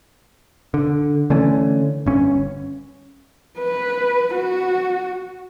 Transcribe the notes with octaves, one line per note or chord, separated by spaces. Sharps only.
D3
D3 E3 A3 C#4
G1 C#4
B4
F#4